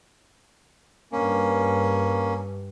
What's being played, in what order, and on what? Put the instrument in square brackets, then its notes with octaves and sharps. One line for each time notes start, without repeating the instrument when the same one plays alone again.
[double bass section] G2 [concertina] A#3 C#4